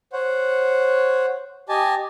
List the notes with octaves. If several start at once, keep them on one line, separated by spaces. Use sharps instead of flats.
C5 C#5 F#5
G4 D#5 G#5 A5